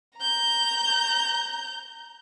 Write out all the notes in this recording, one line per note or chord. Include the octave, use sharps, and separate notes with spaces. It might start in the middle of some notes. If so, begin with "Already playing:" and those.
A#5 G6